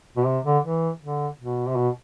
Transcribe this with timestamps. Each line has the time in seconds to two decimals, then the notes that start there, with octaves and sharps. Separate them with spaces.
0.16 B2
0.26 C3
0.45 D3
0.64 E3
1.01 D3
1.39 B2
1.67 C3
1.76 B2